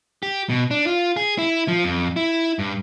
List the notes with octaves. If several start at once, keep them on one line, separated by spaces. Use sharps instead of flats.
G4
B2
D4
F4
G#4
E4
F3
F2
E4
G2